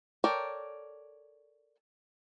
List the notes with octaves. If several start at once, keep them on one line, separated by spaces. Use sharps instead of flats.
A4 A#4 C#5 D5 G5